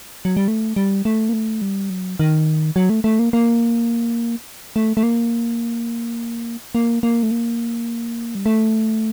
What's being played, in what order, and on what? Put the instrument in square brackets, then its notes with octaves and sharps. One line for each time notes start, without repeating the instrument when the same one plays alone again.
[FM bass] F#3
G3
A3
G3
A3
A#3
A3
G3
F#3
D#3
F#3
A3
A3
A#3
A#3
A3
A3
A#3
A#3
A#3
A3
A#3
G3
A3